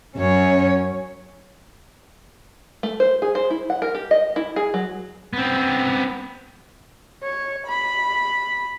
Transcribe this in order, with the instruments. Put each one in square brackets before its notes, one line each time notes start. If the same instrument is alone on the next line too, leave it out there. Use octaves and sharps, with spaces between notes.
[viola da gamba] F#2 [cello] C#4 C#5
[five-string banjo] A3
C5
G#4
C5
E4
F#5
A#4
G4
D#5
E4
G#4
F#3
[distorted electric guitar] B3 C4
[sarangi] C#5
B5